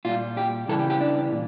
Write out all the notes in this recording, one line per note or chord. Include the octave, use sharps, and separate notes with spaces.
A#2 G3 F4
G4
C#3 E3 G3 A4
G4
G4
D4
A#2